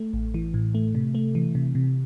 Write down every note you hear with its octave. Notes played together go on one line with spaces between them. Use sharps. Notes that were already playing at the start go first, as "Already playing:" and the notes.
Already playing: A3
A1
E3
A2
A3
C3
A3
E3
C3
C3